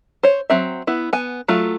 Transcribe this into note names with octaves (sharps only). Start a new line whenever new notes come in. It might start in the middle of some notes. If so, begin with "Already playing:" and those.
C5 C#5
F#3 C4 E5
B3 E4
B3 G#5
F#3 A3 F4